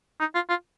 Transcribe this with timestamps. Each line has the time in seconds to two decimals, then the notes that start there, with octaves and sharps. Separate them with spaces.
0.20 D#4
0.35 F4
0.49 F4